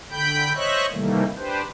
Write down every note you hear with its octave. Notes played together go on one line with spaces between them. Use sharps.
D3 G5 B5 G6
C5 C#5 D#5 E5 C#6 F#6
C3 D#3 E3 G3 A3 A#3
D4 G4 B4 C5